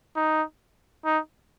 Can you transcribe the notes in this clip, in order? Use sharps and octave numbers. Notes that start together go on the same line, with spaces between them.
D#4
D#4